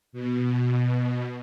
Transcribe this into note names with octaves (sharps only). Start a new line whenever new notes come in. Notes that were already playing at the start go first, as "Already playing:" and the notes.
B2